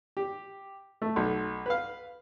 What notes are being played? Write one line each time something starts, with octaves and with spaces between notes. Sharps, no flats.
G4
A3
B1
B4 F5